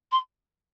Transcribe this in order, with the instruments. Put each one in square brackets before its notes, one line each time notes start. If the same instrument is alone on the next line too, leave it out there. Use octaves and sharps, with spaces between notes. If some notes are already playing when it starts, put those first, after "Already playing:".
[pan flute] C6